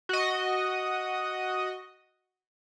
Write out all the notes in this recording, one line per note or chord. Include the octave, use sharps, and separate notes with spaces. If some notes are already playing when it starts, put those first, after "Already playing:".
F#4 D#5